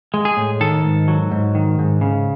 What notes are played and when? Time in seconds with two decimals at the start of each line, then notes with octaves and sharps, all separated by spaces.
0.14 G#3
0.25 G#4
0.37 A2
0.61 D#3 A4
0.84 G#2
1.08 F#3
1.31 G#2
1.55 D#3
1.79 G#2
2.01 C#3